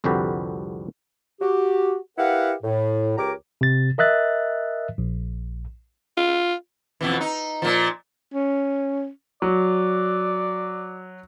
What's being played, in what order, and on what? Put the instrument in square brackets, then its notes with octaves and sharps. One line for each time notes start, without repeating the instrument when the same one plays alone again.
[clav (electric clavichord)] C2 F2 D3 F#4 G4 B4
[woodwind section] F#4 G4
E4 G4 A#4 B4 F5 F#5
A2
C#2 G4 A#4 C#5 A#5 D6
[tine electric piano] C3 A6
A#4 D#5 E5 F#6 A6
A#1
[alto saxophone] F4
[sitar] F2 B2 E3
D#4
A#2 F3
[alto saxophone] C#4
[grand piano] F#3 [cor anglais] D5